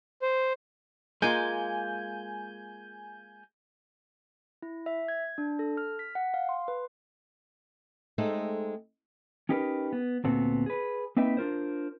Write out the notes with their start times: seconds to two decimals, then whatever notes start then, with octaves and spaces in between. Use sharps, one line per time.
0.22 C5
1.22 G#3 A#3 F4 G#5 G6
4.62 E4
4.86 E5
5.08 G#6
5.38 D4
5.59 A4
5.77 F6
5.99 B6
6.15 F#5
6.34 F5
6.49 C6
6.68 B4
8.18 G#3 A3 C4 D#4 A4
9.49 C#4 D#4 G4 A#4 B4
9.92 B3
10.24 D2 A#2 B3 C4 F#4 A4
10.66 G#4 B4
11.17 A#3 C4 D#4 B4 E5 G5
11.37 D4 F4 A#4 C5